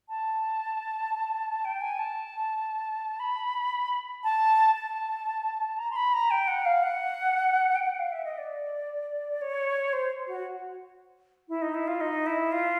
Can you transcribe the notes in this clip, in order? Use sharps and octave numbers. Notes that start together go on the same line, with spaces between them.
A5
G5
G#5
A5
B5
A5
A5
A#5
C6
B5
A#5
G5
F#5
F5
F#5
G5
F#5
F5
E5
D#5
D5
C#5
C5
F#4
E4
D#4
E4
F4
D#4
E4
F4